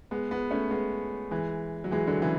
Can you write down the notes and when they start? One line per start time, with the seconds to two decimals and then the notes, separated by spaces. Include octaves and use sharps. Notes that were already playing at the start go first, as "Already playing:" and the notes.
0.11 G#3 B3
0.31 G#3 B3
0.51 A3 C#4
0.71 G#3 B3
1.31 E3 G#3
1.84 F#3
1.92 E3 G#3
2.07 D3 F#3
2.22 C#3 E3